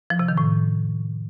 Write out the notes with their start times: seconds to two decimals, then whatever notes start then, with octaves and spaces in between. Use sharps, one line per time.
0.10 F3
0.19 C3
0.28 D#3
0.38 A2